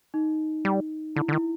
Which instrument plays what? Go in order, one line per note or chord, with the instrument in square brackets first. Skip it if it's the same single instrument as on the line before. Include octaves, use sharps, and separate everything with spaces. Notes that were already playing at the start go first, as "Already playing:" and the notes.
[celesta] D#4
[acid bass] G3
[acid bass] D3 [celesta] E4
[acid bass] D3
[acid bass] D#3 [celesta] E4